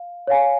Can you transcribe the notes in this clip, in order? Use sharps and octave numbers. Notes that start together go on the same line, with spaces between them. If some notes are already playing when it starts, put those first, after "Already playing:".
Already playing: F5
C#5 F5 G#5